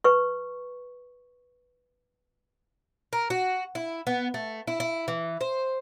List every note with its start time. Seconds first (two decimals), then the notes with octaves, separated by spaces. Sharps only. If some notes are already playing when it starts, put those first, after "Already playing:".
0.04 B4 C#6
3.13 A#4
3.30 F#4
3.75 E4
4.07 B3
4.34 A3
4.68 E4
4.80 E4
5.08 E3
5.41 C5